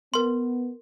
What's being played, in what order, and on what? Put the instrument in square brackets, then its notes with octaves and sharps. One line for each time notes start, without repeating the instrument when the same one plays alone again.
[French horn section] B3 [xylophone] A#4 C6